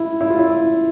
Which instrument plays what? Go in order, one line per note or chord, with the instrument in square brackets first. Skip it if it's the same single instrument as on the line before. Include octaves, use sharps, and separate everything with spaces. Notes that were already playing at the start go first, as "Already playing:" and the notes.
Already playing: [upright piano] E4
E4
F4
E4
E4